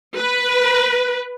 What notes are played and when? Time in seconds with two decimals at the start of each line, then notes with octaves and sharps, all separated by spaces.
0.15 B4